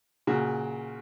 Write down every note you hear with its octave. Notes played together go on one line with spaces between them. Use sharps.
A#2 C#3 F#4